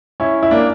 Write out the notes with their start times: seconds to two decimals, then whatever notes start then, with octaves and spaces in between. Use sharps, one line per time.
0.20 C#4 E4
0.43 E4
0.51 A#3 D4